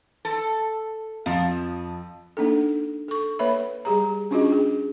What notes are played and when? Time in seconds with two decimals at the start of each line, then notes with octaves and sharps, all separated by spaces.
0.25 A4
1.26 F2 F3
2.37 A#3 D4 D#4 A4
3.08 A4 C#6
3.39 A#3 B4 C#5 E5 B5
3.85 G3 G4 G#4 A#5
4.31 C#4 D4 F4 F#4 G#4 D#5
4.52 G#4